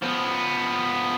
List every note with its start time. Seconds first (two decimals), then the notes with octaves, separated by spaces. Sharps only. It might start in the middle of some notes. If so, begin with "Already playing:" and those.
0.02 F3 B3